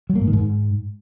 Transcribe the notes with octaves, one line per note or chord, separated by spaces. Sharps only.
F#3
A#3
G#2
D#3
G#2